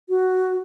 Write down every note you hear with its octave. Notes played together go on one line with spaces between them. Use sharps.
F#4